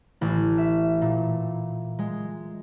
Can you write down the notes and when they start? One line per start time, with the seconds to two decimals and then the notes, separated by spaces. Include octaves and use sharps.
0.21 A1
0.58 E5
1.02 A#2
1.99 G#3